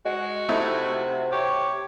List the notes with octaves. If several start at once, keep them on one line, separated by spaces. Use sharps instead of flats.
G#3 F#4
C3 A3 D#4 E4
G4 C#5